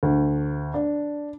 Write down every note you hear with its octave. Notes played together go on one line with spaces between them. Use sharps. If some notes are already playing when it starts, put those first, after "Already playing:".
D2
D4